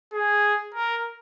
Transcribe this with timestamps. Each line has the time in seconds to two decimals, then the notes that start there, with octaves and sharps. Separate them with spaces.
0.13 G#4
0.74 A#4